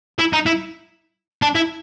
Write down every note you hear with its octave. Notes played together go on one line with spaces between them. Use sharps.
E4
D#4
E4
D4
E4